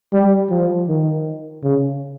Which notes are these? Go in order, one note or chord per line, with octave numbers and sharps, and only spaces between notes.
G3
F3
D#3
C#3